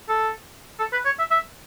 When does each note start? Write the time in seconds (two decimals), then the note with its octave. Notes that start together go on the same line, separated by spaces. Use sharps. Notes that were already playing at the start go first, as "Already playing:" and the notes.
0.09 A4
0.79 A4
0.92 B4
1.05 C#5
1.19 E5
1.31 E5